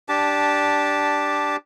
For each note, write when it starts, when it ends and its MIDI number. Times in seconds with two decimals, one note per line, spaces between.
0.09 1.56 62
0.09 1.56 67
0.09 1.56 81